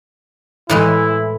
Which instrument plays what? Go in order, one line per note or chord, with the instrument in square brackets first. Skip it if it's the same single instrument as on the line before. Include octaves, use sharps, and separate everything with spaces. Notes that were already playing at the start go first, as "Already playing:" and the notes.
[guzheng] A2 E3 G#3 [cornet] E4